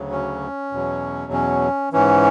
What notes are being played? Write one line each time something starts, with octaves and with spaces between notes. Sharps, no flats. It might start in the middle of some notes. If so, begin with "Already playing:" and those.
Already playing: D2 C#3 F#3
C#4
E2 B2 F#3
C#4
G#2 E3 C#4